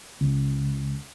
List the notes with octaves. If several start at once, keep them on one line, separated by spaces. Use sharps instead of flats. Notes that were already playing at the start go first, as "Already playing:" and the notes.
C#2